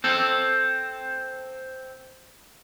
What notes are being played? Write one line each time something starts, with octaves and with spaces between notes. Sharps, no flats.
C4 A4